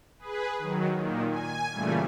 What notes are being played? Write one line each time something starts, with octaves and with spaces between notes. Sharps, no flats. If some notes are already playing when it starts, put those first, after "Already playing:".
G#4 B4
D#3 F#3
A#2 D#3
G#5
A#2 C#3 E3 G3 A3